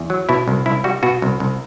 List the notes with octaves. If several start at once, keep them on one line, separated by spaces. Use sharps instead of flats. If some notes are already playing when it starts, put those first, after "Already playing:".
Already playing: E2
F#3
B2 E4
C2
C2 E4
G3 F#4
B2 F#4
C2
C2